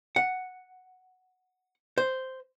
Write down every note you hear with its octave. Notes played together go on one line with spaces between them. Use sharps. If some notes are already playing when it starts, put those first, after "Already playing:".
F#5
C5